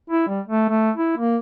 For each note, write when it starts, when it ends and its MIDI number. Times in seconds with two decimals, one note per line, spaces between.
0.10 0.26 64
0.27 0.41 55
0.48 0.67 57
0.69 0.91 57
0.96 1.13 64
1.18 1.38 58